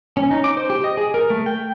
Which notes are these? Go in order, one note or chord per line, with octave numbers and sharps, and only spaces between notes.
C#4
D#4
D6
C5
G4
D#5
G#4
A#4
A3
G5